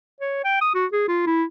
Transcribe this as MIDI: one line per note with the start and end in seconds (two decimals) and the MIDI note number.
0.21 0.44 73
0.45 0.60 79
0.62 0.70 87
0.75 0.86 66
0.93 1.05 68
1.08 1.26 65
1.27 1.44 64